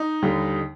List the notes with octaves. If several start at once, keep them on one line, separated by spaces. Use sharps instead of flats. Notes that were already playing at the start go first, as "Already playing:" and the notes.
Already playing: D#4
D#2 D3 G3